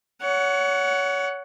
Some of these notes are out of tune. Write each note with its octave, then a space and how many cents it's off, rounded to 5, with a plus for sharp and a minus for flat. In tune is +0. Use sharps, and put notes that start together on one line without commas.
C#5 +25 F#5 +0